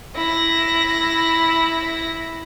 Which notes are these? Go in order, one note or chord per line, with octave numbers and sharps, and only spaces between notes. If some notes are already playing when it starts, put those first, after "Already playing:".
E4 A#6